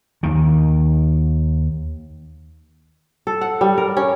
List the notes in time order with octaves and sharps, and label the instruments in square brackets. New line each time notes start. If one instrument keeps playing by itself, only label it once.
[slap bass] D#2 D#3
[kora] A4
F#5
G3
A#4
C#4